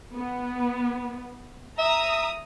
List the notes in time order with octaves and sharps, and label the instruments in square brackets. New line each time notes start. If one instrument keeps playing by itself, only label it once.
[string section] B3
[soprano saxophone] E5 [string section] A#5 D#6